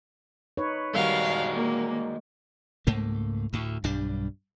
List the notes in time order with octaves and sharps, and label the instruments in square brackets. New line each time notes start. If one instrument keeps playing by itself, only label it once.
[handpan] D#4 B4 C#5
[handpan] D#3 G3 A#4 [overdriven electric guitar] G#3 F#4 [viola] F5
[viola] A#3
[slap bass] C#2 G#2 A3 A#3
D2 A2
B1 G2 G3 D4